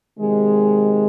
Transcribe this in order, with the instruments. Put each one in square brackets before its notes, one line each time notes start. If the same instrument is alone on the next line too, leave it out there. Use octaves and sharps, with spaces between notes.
[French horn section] C3 D#3 G#3